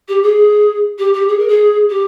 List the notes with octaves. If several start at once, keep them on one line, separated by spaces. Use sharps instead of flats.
G4
G#4
G4
G4
G#4
A#4
G#4
G4